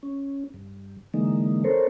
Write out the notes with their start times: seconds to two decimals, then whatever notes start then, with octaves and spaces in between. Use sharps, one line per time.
0.03 C#4
0.54 G2
1.14 D3 E3 G#3 A#3 D#4
1.64 C4 A4 A#4 C5 C#5